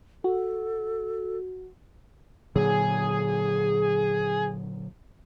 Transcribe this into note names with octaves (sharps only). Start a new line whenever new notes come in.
F#4 A4
A#2 D3 F#3 G#4